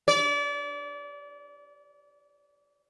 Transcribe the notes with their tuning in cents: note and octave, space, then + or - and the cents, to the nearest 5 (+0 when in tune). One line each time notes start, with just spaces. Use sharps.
D5 -30